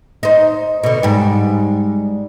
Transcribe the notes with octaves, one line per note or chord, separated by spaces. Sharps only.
D#4 C5
B2 D3
G#2 G3